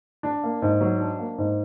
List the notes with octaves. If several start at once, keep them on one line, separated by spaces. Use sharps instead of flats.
D4
A#3
G#2
F#3
D4
A#3
G#2